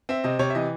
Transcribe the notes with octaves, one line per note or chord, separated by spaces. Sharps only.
C4 E5
C3 D#5
C3 C#5
E5
E3 D#5